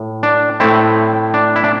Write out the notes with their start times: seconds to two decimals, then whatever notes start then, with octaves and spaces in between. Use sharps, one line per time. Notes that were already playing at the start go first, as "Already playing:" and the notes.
Already playing: A2
0.23 D4
0.60 A2 A3 C4 E4
1.34 D4
1.56 E4
1.64 D4